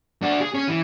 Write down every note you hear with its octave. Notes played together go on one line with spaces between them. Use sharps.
D4 F#4
G#4
C#4
E3